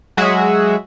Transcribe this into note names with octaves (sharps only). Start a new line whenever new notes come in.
F#3 G#3 F#4 G#4 E5